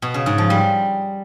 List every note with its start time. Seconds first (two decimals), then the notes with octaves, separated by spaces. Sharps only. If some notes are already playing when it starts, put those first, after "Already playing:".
0.02 B2
0.14 C#3
0.26 G#2
0.38 F3
0.50 G3